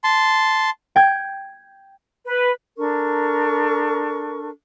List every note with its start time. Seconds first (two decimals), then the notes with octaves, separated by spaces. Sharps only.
0.04 A5 C6
0.96 G5 G#6
2.26 B4
2.77 D4 A4 A#4 C#6